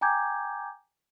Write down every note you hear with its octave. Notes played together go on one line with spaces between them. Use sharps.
G5 G#5 A#5 D6 G6 G#6